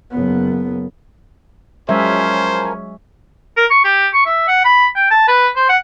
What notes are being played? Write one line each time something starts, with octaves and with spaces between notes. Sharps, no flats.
F#1 B3
F3 F#3 G#3 C#4 A#4 C5 E5 G#5
A#4
C#6
G4
C#6
E5
F#5
B5
G5
A5
B4
C5
F#5